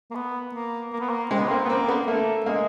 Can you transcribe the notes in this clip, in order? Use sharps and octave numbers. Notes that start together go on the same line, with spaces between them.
A#3
B3
A#3
A#3
B3
A#3
G#3 C4
B3
A#3 C4
B3
A#3 C4
B3
A3 A#3
G#3 A#3